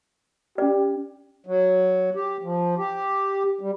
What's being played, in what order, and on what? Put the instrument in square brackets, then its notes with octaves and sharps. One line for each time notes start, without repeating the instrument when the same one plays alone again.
[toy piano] C#4 D5 [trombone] G4
[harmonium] F#3
G4
F3
G4
G3